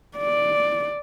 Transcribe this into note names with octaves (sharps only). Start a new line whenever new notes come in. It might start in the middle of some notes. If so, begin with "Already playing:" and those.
D5